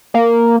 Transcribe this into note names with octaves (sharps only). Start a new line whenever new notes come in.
A#3